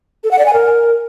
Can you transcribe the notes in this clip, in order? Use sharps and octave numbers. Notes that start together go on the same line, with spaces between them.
A4
F#5
D5
G#5
A#4